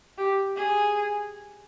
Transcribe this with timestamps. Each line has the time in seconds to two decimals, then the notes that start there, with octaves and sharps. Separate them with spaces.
0.18 G4
0.56 G#4